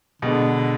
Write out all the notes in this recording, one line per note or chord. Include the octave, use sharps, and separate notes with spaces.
B2 D3 G#3 B3